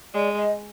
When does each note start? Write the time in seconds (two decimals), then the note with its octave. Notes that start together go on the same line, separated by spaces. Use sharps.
0.14 G#3 D5
0.36 D#5